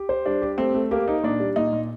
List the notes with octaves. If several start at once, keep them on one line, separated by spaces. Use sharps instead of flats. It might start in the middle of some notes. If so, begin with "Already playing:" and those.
Already playing: G4
C5
G3 D4
G4
A3 C4
A3
A#3 G4
D#4
A#2 D4
G3
A#2 D#4
A#2